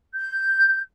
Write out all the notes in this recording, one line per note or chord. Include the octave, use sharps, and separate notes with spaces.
G6